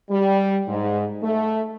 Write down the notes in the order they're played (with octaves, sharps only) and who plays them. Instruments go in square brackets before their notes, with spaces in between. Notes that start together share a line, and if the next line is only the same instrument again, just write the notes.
[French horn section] G3
G#2
A3